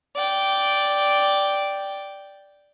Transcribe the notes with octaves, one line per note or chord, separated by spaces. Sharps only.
D5 G5